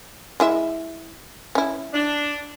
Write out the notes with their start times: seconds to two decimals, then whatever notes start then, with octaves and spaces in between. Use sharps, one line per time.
0.40 G#3 E4 E5
1.55 C#4 E4
1.94 D4